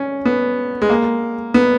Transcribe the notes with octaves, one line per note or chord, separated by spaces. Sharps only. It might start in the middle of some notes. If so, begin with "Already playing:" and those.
Already playing: C#4
B3
G#3
A#3
B3